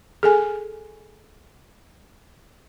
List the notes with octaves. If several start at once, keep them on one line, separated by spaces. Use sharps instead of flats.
G#4 A4 G#5